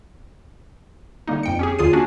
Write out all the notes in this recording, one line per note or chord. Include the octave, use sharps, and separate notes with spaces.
D3 G3 A#3 D#4
F2 G5 C#7
C#4 G4 G#4
D#2 D3 F4 G#4 C7 D#7
A#3 C#4 D4 F#4